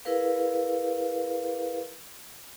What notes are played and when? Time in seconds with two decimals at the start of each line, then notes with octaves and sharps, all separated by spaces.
0.05 E4 G#4 A#4 B4 F5